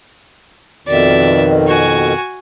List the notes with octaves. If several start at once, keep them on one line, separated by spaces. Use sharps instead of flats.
F2 B2 D#3 D5 E5
F#4 G#5